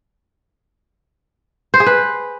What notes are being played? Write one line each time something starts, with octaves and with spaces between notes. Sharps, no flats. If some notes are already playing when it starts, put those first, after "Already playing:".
C5
G#4
B4